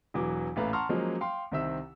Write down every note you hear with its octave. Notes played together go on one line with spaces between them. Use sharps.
E1 E3 F#3 D6
A1 A#2 A3 B4 F5 A#5
F#5 A5 A#5 C6 C#6 F6
F3 F#3 G#3 A#3 C#4 C5
F5 G5 C6
C2 D#3 C4 E5 E6